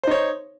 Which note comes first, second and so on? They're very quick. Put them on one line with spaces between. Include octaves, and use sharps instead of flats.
C5 D#4 C#5